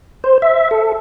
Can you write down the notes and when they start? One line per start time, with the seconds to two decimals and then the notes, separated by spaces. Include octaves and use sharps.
0.24 C5
0.42 E5
0.71 A4